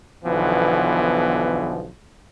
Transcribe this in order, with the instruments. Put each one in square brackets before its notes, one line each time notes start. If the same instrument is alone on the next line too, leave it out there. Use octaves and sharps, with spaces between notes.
[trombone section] B1 D3 E3 F3 B3